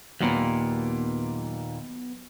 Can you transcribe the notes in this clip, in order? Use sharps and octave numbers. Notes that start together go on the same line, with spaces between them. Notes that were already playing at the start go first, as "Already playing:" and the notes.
D#2 A#2 F#3 B3